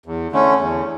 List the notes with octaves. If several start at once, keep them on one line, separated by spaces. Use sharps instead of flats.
E2
D3 A3 C#4
E2